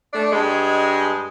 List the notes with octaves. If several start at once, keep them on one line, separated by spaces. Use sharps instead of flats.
A3 D4 D5
G2 G#3